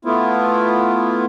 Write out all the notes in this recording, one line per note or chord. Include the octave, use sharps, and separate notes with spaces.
A3 B3 E4 F4